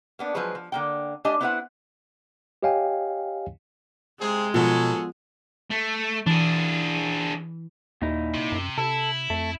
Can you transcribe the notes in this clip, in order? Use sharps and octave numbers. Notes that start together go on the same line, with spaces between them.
A#3 B3 D4
F3 F#3 G#3 G#4 B4 C5
F3
D3 A#3 G5
A3 D4 G4 D#5 G#5
B3 C4 E4 B4 C5 F#5
G4 C#5 D#5 F5 G5 G#5
C3 G#3 C4 G#4
B2 F3 F#3 G#4 A4
A3
E3 D4 G#4
D#2 A#2 D#4 E4
C3
F#2
C3 E4 A4
F2 A3